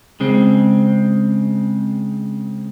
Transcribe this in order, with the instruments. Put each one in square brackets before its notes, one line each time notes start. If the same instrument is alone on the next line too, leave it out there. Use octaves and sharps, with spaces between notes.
[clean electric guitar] C#3 G#3 C4